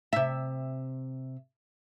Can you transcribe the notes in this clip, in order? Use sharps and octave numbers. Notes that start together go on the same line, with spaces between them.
C3 E5